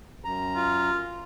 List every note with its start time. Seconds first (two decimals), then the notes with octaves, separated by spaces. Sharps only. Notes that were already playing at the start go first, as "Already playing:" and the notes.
0.24 F#2 A#5
0.56 F4